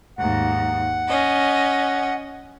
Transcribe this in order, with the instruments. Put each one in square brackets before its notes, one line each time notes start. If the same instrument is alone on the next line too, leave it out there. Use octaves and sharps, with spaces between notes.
[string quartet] D#2 G#2 [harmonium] F#5
[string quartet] C#4 D#5